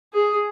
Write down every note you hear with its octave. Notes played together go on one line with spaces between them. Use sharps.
G#4